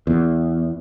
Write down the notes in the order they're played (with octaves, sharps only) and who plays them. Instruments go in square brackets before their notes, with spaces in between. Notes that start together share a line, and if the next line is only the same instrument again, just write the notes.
[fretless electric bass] E2